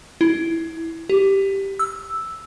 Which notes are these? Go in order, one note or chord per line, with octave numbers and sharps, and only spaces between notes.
E4
G4
E6